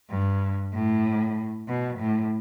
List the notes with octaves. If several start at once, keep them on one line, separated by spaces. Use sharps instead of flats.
G2
A2
B2
A2